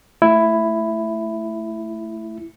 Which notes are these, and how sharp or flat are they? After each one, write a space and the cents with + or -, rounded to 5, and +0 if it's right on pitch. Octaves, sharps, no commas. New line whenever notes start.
A3 +0 E4 +5